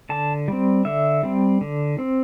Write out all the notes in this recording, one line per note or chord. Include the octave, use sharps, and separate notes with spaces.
D3 A5
G3 C4
D3 E5
G3 C4
D3
C4